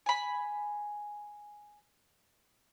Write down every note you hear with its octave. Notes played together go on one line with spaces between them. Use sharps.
G#5 B5